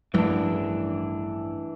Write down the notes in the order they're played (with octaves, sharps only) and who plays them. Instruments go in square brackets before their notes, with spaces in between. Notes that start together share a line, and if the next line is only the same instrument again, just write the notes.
[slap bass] A1 G2 F3 [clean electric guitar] E3 D4 [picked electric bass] G3